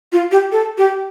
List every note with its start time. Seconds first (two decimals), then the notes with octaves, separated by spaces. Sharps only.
0.12 F4
0.32 G4
0.52 A4
0.78 G4